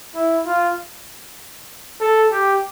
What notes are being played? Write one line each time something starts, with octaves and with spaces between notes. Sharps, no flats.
E4
F4
A4
G4